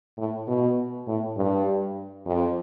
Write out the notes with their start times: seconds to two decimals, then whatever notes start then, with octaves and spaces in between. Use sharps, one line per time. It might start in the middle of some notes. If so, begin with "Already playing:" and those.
0.18 A2
0.48 B2
1.07 A2
1.37 G2
2.26 F2